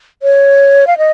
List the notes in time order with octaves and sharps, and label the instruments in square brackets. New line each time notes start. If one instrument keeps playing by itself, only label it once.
[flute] C#5
F5
D#5